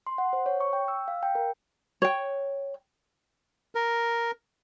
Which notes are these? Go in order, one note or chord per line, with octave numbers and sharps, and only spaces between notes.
C6
F#5
C5
C#5
C#6
G5
E6
F5
G5
A#4
C#5 G5
A#4